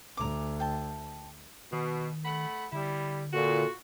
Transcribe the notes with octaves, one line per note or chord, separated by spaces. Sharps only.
D2 A#5 D6
G5 A5
B2 D#3
A3 F#5 B5
D3 G3 E4
A#2 F4 F#4 A4